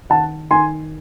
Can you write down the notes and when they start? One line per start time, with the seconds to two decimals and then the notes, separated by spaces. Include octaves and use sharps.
0.10 D#3 F#5 A5
0.50 D#3 G#5 C6